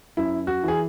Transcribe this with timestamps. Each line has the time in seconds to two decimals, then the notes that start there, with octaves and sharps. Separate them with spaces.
0.17 F#2 E4
0.47 F#4
0.63 E3 G#4